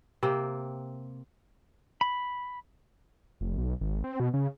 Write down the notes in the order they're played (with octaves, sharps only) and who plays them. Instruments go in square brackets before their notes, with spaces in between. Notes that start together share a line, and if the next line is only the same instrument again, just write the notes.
[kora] C3 A#3 C4
[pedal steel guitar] B5
[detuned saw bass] F1
B1
G#1
C4
B2
C#3